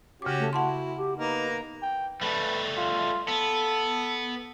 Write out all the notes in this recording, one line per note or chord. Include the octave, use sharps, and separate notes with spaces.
C#3 C#4 F#4 G4 D6
A3
E4 F#4 F#5 A5 C6
G4
A#3 B3 D#4 A#4
G5
G3 A3 B4
F4
B3 A4